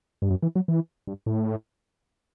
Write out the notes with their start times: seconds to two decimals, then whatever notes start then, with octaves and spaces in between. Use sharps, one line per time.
0.22 G2
0.30 F#2
0.43 E3
0.56 F#3
0.68 E3
1.07 G2
1.26 A2